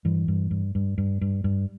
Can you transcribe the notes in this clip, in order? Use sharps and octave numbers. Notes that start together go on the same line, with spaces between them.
G2 E3
G2
G2
G2
G2
G2
G2